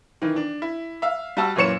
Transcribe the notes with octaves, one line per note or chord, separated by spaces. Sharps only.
D#3 E3
D4
E4
E5 F5
G3 F#4 A5 E6
F#2 A#2 E3 C#5 C#7 E7